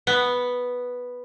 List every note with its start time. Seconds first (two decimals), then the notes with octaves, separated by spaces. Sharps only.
0.07 B3